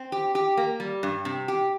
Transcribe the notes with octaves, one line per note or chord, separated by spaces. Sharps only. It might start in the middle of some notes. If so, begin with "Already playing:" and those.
Already playing: C4
G4
G4
A#3
G3
G2
C3
G4